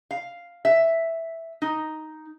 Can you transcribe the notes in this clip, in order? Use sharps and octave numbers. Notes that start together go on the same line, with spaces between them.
F5
E5
D#4